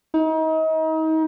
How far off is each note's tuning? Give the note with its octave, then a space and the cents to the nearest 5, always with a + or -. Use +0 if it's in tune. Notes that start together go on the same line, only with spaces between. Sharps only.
D#4 +35